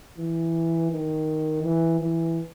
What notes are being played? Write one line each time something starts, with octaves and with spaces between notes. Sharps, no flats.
E3
D#3
E3
E3